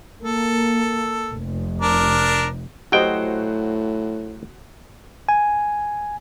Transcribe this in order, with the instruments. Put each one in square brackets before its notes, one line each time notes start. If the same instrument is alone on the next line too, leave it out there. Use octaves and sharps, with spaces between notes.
[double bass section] A#3 [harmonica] A4
[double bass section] F1
[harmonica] D4 A#4
[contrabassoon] A2 [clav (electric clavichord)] F#3 G5 [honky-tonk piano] F#4 C5 [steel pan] G4 D#5
[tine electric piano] G#5